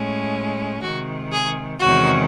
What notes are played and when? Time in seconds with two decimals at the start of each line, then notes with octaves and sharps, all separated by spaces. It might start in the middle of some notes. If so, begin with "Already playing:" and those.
Already playing: A2 G#3 C#4
0.82 C3 D#3 G#3 F#4
1.31 G#4
1.80 E2 C3 D#3 G#3 C#4 F#4